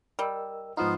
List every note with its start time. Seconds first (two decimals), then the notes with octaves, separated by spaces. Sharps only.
0.19 G3 A#4 D#5 E6
0.77 G#2 F3 B3 D#4 F4 F5 A#5 D#6